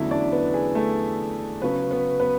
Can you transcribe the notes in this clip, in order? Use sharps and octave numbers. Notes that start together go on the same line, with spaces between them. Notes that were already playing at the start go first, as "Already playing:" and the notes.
Already playing: E2 D3 F#3 A3 C#4 E4 E5
D4 D5
B3 B4
G#4
A3 A4
C#3 F#3 B3 C#4 B4
B3 B4
B3 B4